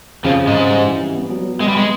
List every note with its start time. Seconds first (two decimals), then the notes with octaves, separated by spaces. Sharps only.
0.24 F2 C#3 F3
0.41 C#3
0.47 G#2 G#3
0.55 C#3
0.70 G3
0.85 E3
1.01 G3
1.15 B3
1.30 F#3
1.45 F#3
1.60 G#3 B3
1.68 G3
1.75 G#3 B3